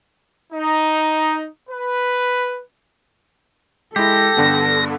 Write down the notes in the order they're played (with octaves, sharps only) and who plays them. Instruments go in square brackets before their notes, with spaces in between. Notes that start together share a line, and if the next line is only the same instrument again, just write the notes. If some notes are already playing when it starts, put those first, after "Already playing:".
[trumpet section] D#4
B4
[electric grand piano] G#3 E4 [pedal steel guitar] G4 [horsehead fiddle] A4 [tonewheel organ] A#6
[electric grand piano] G2 D3 B3